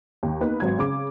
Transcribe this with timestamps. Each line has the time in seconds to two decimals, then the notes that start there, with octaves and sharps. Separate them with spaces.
0.23 D#2
0.41 A#3 B3 D#4 B4
0.60 G#1 F#3 G#6
0.78 C#3 D6